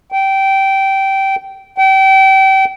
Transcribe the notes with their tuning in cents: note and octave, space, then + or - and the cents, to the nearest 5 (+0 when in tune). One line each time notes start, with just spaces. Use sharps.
G5 -15
G5 -30